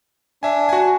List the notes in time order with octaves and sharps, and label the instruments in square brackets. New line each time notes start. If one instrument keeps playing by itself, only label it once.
[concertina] D4 [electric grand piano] E5 G#5
[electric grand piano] F#4 G#5